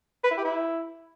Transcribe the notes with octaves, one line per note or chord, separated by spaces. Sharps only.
B4
E4
G4
E4